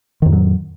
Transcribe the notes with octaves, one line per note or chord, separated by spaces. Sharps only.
F2 A2 D#3 F#3